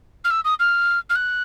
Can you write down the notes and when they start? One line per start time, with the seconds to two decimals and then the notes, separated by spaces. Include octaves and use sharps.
0.25 F6
0.31 E6
0.45 D#6
0.60 F6
1.10 F6
1.15 F#6